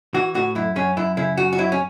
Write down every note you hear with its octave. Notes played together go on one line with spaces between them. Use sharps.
E3 F#4
A2 F#4
F#2 E4
F#2 C#4
F#2 E4
C#3 E4
F#2 F#4
F#4
F#3 E4
C#4